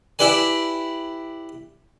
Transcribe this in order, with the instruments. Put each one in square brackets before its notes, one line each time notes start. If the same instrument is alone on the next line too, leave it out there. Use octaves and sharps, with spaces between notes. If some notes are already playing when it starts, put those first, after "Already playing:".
[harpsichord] E4 G4 B4 D5 G#5